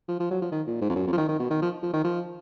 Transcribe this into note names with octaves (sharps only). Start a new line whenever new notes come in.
F3
F3
F#3
F3
D#3
A#2
G#2
F2
F#2
F2
F3
D#3
D#3
B2
D#3
F3
F3
D#3
F3